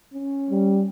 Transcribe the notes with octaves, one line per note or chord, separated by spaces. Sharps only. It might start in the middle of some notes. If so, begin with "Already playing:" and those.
C#4
G3